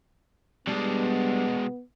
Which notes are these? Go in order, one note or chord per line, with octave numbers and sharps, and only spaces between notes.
B2 G3 G#3 B3 D4